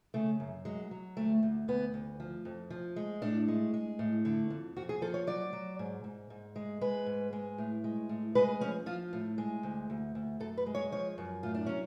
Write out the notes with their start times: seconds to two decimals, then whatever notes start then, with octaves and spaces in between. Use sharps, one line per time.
0.14 C#3 A3
0.40 F#2
0.65 F#3 G#3
0.91 F#3
1.17 D2 A3
1.43 D2
1.68 D2 B3
1.94 D2
2.20 F3
2.45 F2
2.70 F3
2.96 G#3
3.22 A2 D4
3.48 G#3
3.74 G#3
3.99 A2
4.25 D3
4.50 F2
4.76 F2 F#4
4.89 G#4
5.02 F3 A4
5.14 C#5
5.27 F#3 D5
5.53 F#3
5.79 G#2
6.04 G#2
6.30 G#2
6.56 G#3
6.81 G#3 B4
7.06 G#2
7.33 G#3
7.58 A2
7.84 G#3
8.09 A2
8.35 G#3 B4
8.61 F3 C#4
8.86 F3 F4
9.13 A2
9.38 G#3
9.63 D2
9.90 D2
10.15 D2
10.40 F#2 A4
10.58 B4
10.67 G#3
10.75 C#5
10.92 F3 C#5
11.18 F#2
11.43 A2 F4
11.55 D4
11.66 F#3 C#4